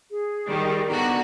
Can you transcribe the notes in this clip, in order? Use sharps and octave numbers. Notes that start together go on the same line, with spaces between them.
G#4
D#3 G3
D3 B3 F#4 A#5